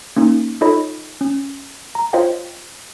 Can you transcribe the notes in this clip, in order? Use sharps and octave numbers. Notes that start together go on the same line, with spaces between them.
A#3 C#4 D#4
D#4 F4 A4 C#5 D#5 B5
C#4
A#5
F4 C5 C#5 D#5 F5 G5